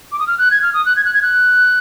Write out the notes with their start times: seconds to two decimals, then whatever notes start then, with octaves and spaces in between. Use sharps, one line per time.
0.12 D6
0.19 D#6
0.27 F6
0.38 F#6
0.51 G#6
0.63 F6
0.74 D#6
0.86 F#6
0.96 G#6
1.05 F#6
1.14 G#6
1.22 F#6